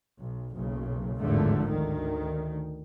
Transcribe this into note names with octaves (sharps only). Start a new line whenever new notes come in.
B1
F#1 B1 C#3
G#1 E2 A2 D3 F3 A3
D2 D#3